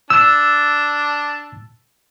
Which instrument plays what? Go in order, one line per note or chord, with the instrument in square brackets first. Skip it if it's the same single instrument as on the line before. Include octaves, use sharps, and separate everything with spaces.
[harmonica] D4 A5 [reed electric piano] E6